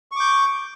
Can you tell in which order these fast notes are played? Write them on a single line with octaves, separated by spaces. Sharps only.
C#6 D6 G6